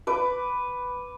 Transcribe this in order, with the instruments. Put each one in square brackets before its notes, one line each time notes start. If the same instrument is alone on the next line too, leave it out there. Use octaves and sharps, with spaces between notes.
[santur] B4 D6